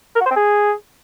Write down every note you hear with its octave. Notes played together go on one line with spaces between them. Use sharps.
A#4
F#4
C5
C4
G#4